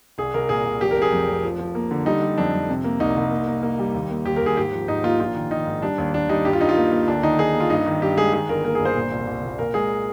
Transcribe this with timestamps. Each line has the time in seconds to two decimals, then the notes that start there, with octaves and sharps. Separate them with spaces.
0.18 C2 G#4
0.34 C2 A#4
0.49 A#2 G#4
0.65 C2
0.81 F1 G4
0.91 A#4
0.97 F1
1.02 G#4
1.12 F2
1.28 F1
1.43 F3
1.59 F3
1.75 A#3
1.91 D3
2.06 G3 D#4
2.22 G3
2.37 F2 D4
2.53 F2
2.69 C3
2.84 A#3
3.00 C2 D#4
3.16 C2
3.31 A#3
3.47 A#3
3.63 A#3
3.79 G3
3.94 D#2
4.10 A#3
4.25 D#2 G4
4.36 A#4
4.41 D#2
4.46 G#4
4.57 G#2 G4
4.73 F3
4.88 G#2 D#4
5.04 A#3 F4
5.20 A#1 F4
5.35 D#3
5.51 D#3 D#4
5.67 G#2
5.82 G3 D4
5.98 D#2
6.14 D#2 D4
6.29 G3 D#4
6.45 G2 G4
6.53 F4
6.61 G2 D#4
6.69 F4
6.77 A#3
6.92 A#3
7.08 D2 D4
7.23 D#3 D#4
7.39 D#3 G#4
7.54 A#3
7.60 F4
7.70 G2 D#4
7.86 D#3
8.02 G2 G4
8.17 G#3 G#4
8.33 D#3 G#4
8.49 G1 A#4
8.64 A#3 A#4
8.75 G#4
8.80 G1
8.85 C5
8.96 A#2
9.11 C2
9.27 C2
9.43 A#2
9.59 A#2 A#4
9.74 G#3 G#4